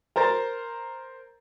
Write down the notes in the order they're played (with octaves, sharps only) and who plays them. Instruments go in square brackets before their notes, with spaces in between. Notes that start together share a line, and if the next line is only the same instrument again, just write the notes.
[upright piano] A#4 C5 A#5 A6